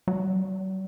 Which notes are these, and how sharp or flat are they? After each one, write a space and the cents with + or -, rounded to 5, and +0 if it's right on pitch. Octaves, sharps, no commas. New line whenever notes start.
F#3 +45